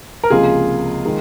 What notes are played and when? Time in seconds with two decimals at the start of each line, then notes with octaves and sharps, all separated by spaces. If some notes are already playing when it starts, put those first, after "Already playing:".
0.24 A#4
0.30 C#2 C3 F3 A#3 F4 G#4
1.05 D#3 G#3